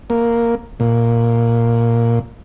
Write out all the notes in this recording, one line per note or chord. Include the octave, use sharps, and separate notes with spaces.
A#3
A#2